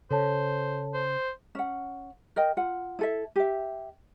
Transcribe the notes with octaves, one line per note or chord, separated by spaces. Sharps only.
C#3 A4 C5 C#5 A5
C5
C#4 F#5
A#4 D#5 G5
F4 F#5
E4 A4 E5
G4 E5